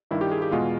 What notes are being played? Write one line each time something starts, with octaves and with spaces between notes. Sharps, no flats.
G2 D#3 G3 E4
G4
G#4
G4
E2 B2 G#3 F4